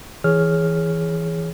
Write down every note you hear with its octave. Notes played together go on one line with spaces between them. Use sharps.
E3 G#4 C#5 F6